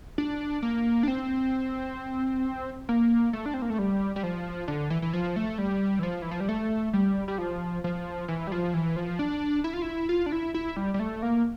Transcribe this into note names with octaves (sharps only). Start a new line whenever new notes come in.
D4
A#3
D4
C4
A#3
A3
D4
C4
A#3
A3
G3
G3
F3
D3
E3
E3
F3
A3
G3
E3
F3
E3
F3
G3
A3
G3
G3
F3
F3
E3
G3
F3
E3
F3
D4
E4
F4
E4
F4
D4
E4
E4
G3
G3
A3
A#3